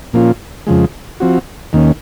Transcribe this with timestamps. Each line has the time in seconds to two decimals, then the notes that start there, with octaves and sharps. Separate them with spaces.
0.13 A#2 F3 A#3 C#4 F4
0.67 F2 C#3 F3 G#3
1.20 F3 C4 F#4
1.73 D#2 D#3 A#3 C#4